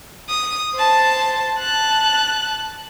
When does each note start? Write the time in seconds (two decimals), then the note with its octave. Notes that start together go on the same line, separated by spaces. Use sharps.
0.29 D#6
0.75 C5 A5
1.58 A5 F#6